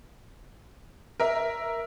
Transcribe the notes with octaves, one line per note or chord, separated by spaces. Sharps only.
A#4 E5